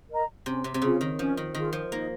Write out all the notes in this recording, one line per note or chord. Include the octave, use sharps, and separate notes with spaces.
A#4 D#5 A#5
C3 C#4
C3
C3
C#3 F4 G#4
D#3
F3 C#4
D#3
D#3 F4 G#4
F3
A#3 D#4